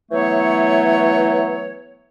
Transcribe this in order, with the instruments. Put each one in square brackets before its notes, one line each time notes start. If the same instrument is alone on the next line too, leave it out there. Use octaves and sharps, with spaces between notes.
[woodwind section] E3 F#3 A3 B3 C#5